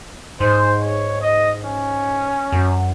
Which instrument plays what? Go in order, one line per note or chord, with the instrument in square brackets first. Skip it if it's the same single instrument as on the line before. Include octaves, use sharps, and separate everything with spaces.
[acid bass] G#2 [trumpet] C5
[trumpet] C#5
D#5
C#4
[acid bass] F#2